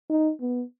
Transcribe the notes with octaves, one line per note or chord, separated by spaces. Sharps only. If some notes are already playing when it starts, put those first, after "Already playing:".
D#4
B3